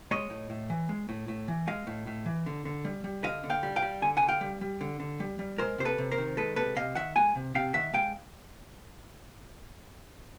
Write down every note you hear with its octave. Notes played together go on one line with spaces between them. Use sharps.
G#3 C#5 D#5
A2
A2
E3
G#3
A2
A2
E3
G#3 D#5 F5
A2
A2
E3
D3
D3
G3
G3
D3 D#5 F5
D3
F5 G5
G3
F5 G5
G3
D3 G#5
F#5 G#5
D3
F5 G5
G3
G3
D3
D3
G3
G3
G#3 A#4 C5
C3 C5
A4 B4
C3
A#4 C5
D#3
G#3 A4 B4
C3 A4 B4
C3 D#5 F5
D#3 E5 F#5
G#3 F#5 G#5
C3
C3 F5 G5
D#3 E5 F#5
G#3 F5 G5